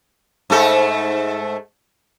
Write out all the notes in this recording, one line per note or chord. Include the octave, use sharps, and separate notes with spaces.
G#2 A3 A4